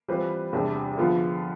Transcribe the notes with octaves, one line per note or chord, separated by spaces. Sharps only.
E3 G3 C4 F4 B4
E2 C3 G3 D4
D3 F3 B3 F4